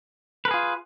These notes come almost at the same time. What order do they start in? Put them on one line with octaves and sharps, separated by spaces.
B4 A#4 G#4 F4